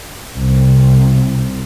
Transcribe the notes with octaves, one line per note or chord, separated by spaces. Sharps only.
C2 C3